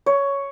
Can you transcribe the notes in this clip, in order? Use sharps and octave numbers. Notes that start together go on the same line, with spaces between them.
C#5